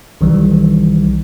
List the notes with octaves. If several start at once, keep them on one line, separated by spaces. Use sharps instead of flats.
B1 D#3 E3 G3